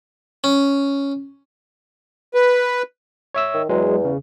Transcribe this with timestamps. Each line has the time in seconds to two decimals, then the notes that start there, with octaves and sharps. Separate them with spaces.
0.44 C#4
2.34 B4
3.35 C#5 E5 E6
3.54 D#3
3.69 E2 F#3 G#3
4.05 C#3